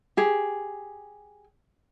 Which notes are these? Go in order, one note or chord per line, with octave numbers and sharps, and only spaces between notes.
G4 G#4